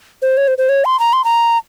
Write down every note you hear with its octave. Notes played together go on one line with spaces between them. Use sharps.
C5
C#5
C5
C5
C#5
C6
A#5
C6
A#5